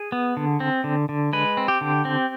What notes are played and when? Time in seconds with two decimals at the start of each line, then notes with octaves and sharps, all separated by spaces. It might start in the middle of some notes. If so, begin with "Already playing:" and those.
Already playing: G#4
0.12 B3
0.37 D3
0.60 C4
0.84 D3
1.09 D3
1.33 G#3 B4
1.57 C4
1.68 G4
1.81 D3
2.05 C4